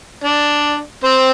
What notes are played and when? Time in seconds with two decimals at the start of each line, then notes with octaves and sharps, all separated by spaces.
0.24 D4 D5
1.04 C4 C5